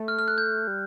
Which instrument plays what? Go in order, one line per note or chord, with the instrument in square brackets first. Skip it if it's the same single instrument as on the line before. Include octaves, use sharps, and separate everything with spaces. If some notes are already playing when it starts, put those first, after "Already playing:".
Already playing: [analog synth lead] A3
[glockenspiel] F6
F6
F#6
G6
[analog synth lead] G3